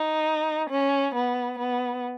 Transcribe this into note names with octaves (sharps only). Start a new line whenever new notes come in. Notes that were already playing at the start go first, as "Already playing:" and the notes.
Already playing: D#4
C#4
B3
B3